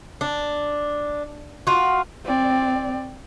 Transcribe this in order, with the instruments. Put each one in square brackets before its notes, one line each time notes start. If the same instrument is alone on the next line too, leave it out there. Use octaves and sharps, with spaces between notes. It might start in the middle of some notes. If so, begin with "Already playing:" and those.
[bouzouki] D4
F4 F#4
[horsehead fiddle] C4 D5